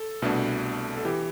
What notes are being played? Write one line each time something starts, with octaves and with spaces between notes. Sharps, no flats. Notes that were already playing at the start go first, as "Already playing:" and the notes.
Already playing: A4
C2 B2 A3 D4
A4
E3 G4